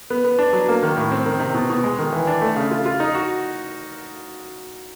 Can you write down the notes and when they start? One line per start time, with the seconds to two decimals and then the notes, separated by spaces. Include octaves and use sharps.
0.10 B3
0.24 B3
0.39 D4
0.53 F#3
0.68 A#3
0.83 D#3
0.97 A2
1.11 C4
1.26 D#3
1.40 C3
1.54 B2
1.70 B2
1.84 G#3
1.99 D#3
2.12 E3
2.27 D4
2.42 A3
2.56 C#3
2.71 F4
2.86 F4
3.00 D#4
3.15 F#4